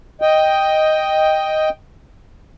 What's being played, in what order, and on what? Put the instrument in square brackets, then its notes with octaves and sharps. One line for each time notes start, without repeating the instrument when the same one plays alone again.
[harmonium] D#5 G5